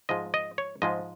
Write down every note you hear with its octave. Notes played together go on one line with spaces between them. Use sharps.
G#2 F3 G#3 D#5
D#5
C#5
G#2 F3 G#3 D#5